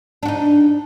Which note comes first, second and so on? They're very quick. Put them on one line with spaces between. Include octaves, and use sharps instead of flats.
D4 F#4 D#4